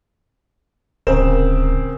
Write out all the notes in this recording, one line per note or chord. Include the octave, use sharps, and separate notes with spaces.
D1 C#3 C4 A#4 E7